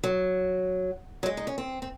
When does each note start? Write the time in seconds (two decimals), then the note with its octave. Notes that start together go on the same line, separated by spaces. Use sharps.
0.04 F#3
1.23 F#3
1.26 G#3
1.37 D#4
1.47 C#4
1.58 C4
1.82 C4